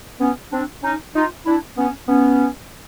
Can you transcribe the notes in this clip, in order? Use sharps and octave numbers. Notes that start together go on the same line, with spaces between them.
B3 C#4
C4 D4
C#4 D#4
D#4 F4
D4 E4
B3 C#4
B3 C#4